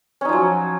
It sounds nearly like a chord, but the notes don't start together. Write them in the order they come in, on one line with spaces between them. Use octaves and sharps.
C#4 D#4 F3 F#3